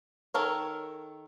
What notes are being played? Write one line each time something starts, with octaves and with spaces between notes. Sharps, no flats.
D#3 A4 A#4 C#5